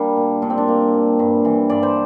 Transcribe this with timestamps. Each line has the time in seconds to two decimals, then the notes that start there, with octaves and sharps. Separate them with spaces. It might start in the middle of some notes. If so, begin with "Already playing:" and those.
Already playing: G3 A#3 D4
0.17 A#2
0.42 A#2 D4
0.50 C4
0.58 D4
0.68 A#3
0.94 A#2
1.19 G2
1.45 E3
1.69 G2 D5
1.83 C5